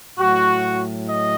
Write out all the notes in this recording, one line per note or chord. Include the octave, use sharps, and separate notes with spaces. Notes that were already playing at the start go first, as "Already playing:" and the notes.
A2 F#3 F#4
D#5